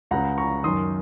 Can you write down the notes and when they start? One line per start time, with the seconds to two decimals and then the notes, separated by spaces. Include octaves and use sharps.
0.11 C#2 C#3 F#5 A#5
0.38 A#5 C#6
0.64 F#2 D#3 C6 D#6